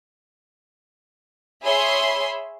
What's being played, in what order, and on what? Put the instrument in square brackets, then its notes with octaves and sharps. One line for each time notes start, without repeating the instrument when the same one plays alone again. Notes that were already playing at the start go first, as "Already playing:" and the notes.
[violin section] G#4 C#5 E5 B5 C6